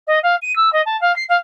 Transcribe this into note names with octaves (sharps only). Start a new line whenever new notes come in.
D#5
F5
D#7
E6
D#5
A5
F5
C7
F5